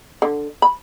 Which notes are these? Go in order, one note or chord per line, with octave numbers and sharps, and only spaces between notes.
D3
B5